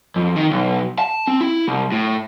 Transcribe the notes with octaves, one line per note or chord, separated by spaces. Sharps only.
F2
D#3
B1
A5
C4
E4
C2
A2